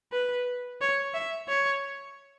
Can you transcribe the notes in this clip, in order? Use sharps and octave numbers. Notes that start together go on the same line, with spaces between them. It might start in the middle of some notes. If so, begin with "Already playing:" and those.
B4
C#5
E5
C#5